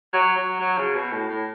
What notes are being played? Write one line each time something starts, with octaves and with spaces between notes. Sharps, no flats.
F#3
F#3
F#3
C#3
B2
A2
A2